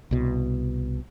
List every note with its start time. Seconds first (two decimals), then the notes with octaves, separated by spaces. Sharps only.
0.11 C2 B2